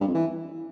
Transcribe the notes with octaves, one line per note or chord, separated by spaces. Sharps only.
G2
F2
E3